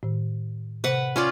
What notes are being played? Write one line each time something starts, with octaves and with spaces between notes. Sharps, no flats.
A2 D#3
C3 B4 C5 F#5
C#4 F4 D5